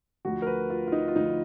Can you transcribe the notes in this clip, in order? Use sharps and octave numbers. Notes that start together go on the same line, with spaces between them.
D2 D3 F3 F#4
A#4
B4
F4
F4
D#4
F4
D2 D3 F3 D#4